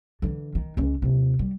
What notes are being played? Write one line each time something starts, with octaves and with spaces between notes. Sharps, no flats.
D3 E3
D#3
C#2 C#4
D#2 C3
G3